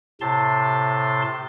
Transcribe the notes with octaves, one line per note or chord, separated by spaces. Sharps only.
A2 C3 A5 C6